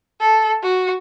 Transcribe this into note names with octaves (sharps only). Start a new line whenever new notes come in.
A4
F#4